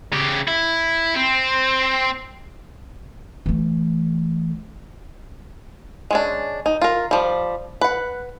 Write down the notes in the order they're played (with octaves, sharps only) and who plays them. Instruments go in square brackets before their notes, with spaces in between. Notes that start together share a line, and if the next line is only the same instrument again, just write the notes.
[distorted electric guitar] C#3 G4
E4
C4
[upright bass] E3 A3
[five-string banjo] G#3 C#4 D4
D#4
F4 A#4
F3 G3
B4 F#5